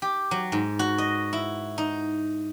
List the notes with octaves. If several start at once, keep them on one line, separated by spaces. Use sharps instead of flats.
G4
F#3
G#2
F#4
D#5
E4
D#4